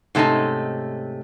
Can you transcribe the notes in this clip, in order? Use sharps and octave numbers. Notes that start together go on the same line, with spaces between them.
G#2 C3 A3 C#4 D#4